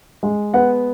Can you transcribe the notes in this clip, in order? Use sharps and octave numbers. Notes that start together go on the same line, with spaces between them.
G#3
B3 F#5